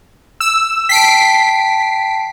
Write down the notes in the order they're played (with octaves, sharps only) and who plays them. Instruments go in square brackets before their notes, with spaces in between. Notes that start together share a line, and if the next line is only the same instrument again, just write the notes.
[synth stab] E6
[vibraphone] G5 A5 [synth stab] B6 C7 D7